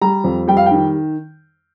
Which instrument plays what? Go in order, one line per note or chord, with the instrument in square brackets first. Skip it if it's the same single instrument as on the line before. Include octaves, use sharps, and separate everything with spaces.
[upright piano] G3 A#5
F2
G3 G5
F5
G5
D#3